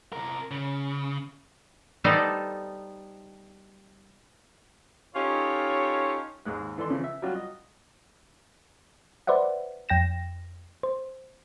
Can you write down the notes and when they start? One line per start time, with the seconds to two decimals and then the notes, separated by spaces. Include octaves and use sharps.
0.13 C3 A#4
0.51 C#3
2.04 G3 B3 D#4 A4 C5 D5
5.15 C#4 D#4 F4 G4 A4 C#5
6.45 D#2 G#2 G#3 F#6
6.78 E3 A4 D5 C6
6.90 C#3 E3 F3
7.04 E5
7.22 F#3 G3 C#4 F4 F#4
7.35 D#5
9.27 B4 C5 D5 E5 F#5
9.89 F2 G5 A#6 E7
10.83 C5